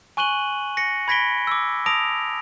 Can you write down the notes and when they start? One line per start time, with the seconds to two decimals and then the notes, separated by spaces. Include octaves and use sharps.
0.17 G#5 C#6 F#6 D#7 F#7 G7
0.77 A#6 C#7
1.08 B5 G#6 A#6 B6 D7 G7
1.47 D6 E6
1.86 A5 D#6 A#6 D7 F7